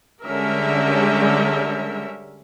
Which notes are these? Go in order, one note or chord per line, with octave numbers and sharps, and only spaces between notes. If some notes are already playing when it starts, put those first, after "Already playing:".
D3 G3 G#3 C#4 A#4 E5